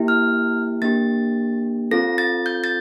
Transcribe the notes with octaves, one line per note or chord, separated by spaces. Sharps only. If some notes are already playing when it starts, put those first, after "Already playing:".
Already playing: A#3 E4 G4
F6
A#3 D4 G4 A6
C4 F4 A4 A#6
A6
G6
A6